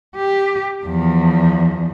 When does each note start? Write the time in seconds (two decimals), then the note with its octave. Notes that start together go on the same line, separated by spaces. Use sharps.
0.16 G4
0.85 E2 F3